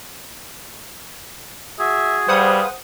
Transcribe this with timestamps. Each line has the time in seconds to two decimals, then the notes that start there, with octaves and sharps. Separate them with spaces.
1.79 F#4 G#4 E5
2.28 G3 B4 C5 F5 F#5 D#6